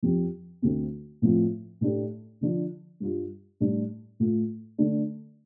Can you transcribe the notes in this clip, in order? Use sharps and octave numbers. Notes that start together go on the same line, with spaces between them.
F2 F3 C4 G4
D2 D3 A3 C4
A2 F3 C4 F4
A2 A3 D4 G4
D3 F3 D4 F4
G2 G3 F4
A2 G3 D4
A2 A3 F4
D3 A3 D4